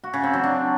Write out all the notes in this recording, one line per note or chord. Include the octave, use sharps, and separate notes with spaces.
F#4
C#3
C4
F#3
D4